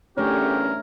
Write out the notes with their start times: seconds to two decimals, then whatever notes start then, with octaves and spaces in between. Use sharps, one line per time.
0.18 E2 G2 A3 C#4 D4 G4 A#4 C#5